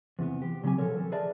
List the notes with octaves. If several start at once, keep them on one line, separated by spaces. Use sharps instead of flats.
E2 C3 E3 B3
G4
C#3 F#3 C4 G4 G#5
B2 F3 A4 A#4 C#5
D#3 A4
G#4 A#4 B4 D5 E5 A5